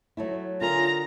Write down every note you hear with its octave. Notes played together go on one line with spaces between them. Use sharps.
F#3 A3 E4
D3 F4 G#4 A#4 A#5